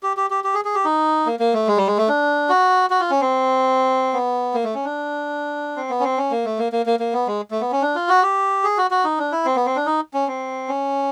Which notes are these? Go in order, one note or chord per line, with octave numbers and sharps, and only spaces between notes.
G4
G4
G4
G4
G#4
G#4
G4
D#4
A#3
A#3
A3
G#3
G3
G#3
A3
D4
F#4
F#4
F4
C#4
C4
B3
A#3
A3
C#4
D4
C4
B3
C#4
C4
C#4
A#3
A3
A#3
A#3
A#3
A#3
B3
G#3
A3
B3
C#4
D4
F4
F#4
G4
G#4
F#4
F#4
D#4
D4
E4
C4
B3
C4
D4
D#4
C#4
C4
C#4